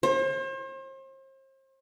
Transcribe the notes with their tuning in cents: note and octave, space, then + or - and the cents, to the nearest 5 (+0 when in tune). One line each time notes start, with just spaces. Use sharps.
C5 +40